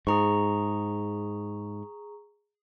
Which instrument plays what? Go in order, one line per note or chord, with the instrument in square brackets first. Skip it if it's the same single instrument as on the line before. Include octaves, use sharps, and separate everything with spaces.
[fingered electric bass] G#2 [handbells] G#4 A#5 C#6